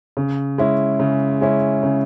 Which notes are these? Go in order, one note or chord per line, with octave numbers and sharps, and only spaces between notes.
C#3
G#3 C#4 E4
C#3
G#3 C#4 E4
C#3